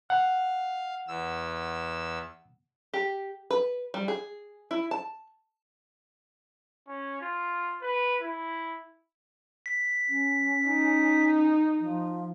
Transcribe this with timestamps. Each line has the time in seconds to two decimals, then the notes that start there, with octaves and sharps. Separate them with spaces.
0.10 F5 F#5
1.08 E2 E6
2.94 G4
3.51 B4
3.94 G3
4.08 G#4
4.71 E4
4.91 A5
6.87 C#4
7.21 F4
7.82 B4
8.21 E4
9.66 B6
10.09 C#4
10.68 D#4
11.80 F3